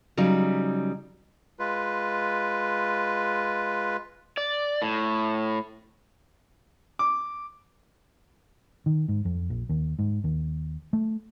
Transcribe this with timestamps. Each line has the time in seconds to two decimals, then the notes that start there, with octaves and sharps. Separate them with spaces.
0.17 C#3 F#3 G3 D#4
1.59 G#3 F4 B4
4.37 D5
4.82 A2
6.99 D6
8.86 D#3
9.08 G#2
9.25 F2
9.50 A#1
9.69 D#2
9.99 G#2
10.24 D#2
10.93 A3